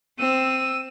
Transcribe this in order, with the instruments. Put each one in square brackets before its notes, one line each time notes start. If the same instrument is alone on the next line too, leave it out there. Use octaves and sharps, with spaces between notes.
[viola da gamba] C4 [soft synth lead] E6 [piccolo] D#7